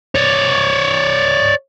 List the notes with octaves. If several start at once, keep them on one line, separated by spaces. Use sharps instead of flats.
C#5 D5